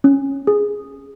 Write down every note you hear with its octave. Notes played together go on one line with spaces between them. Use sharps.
C#4
G#4